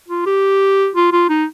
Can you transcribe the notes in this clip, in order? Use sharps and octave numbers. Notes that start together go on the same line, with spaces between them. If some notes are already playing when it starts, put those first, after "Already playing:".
F4
G4
F4
F4
D#4